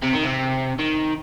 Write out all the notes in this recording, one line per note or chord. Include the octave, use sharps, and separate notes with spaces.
C3
D#3
C3
D#3